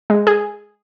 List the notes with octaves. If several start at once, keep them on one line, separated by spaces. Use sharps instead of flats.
G#3
G#4